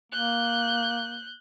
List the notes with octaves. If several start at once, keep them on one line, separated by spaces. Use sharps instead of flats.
A#3 F#6 G6